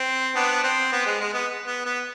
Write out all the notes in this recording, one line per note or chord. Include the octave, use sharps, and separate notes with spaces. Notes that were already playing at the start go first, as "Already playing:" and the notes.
Already playing: C4
B3 D4
C4
B3
G#3
G#3
B3
B3
B3